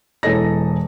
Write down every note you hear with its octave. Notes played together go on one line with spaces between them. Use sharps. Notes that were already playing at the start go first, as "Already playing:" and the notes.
E1 E3 A4 D#5 A#6